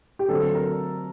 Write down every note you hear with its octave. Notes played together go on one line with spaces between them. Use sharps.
G4
D3 F#3 A3 C4 A4
A#4